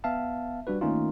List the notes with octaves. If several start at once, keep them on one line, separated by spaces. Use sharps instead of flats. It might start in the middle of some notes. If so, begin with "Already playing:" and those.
B3 E5 F5 A5
G3 D4 F#4 B4
D#3 A3 A#3 C#4 D#4 F4